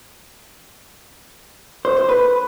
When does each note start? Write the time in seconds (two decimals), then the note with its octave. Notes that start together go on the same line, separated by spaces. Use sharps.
1.85 C5
1.97 C5
2.09 B4